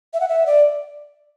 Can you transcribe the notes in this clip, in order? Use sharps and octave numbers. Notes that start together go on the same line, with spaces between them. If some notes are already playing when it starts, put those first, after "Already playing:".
E5
F#5
E5
D5